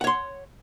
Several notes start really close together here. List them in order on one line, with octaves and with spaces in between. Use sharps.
F#5 C#5 C6